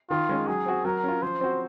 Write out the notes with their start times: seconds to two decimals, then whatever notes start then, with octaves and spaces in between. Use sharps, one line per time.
0.10 D#3 F4
0.29 G#3 C#4
0.47 F#3 G#4
0.66 C4 F#4
0.85 F#3 A#4
1.04 C#4 F4
1.22 F3 C5
1.41 C4 F#4